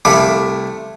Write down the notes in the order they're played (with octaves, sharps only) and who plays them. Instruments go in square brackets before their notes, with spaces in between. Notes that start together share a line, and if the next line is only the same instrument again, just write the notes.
[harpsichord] C2 A3 F5 B5 D6